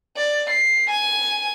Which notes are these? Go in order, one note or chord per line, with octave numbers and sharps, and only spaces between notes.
D5
C7
G#5